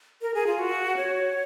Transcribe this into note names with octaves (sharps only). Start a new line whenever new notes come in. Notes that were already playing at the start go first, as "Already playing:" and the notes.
A#4
G#4
F4
F#4
C#5